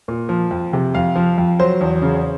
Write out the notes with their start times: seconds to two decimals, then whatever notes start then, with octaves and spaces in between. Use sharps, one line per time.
0.08 A#2
0.29 F3
0.51 F2
0.73 C3
0.94 F2 F5
1.15 F3
1.38 F2
1.60 F#3 C5
1.81 E2
2.02 C#3